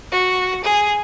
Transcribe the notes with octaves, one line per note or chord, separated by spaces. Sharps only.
F#4
G#4